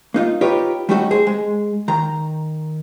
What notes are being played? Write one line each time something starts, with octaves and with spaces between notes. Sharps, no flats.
A#3 D#4 F4
D#4 F4 G4 B4 C#5
G3 A3 C#4 D#4 F#4 A4
G#4 C5
G#3
D#3 A#5